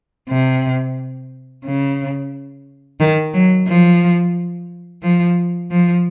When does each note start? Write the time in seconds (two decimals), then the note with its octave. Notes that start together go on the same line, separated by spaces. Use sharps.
0.29 C3
1.65 C#3
3.00 D#3
3.34 F#3
3.68 F3
5.03 F3
5.71 F3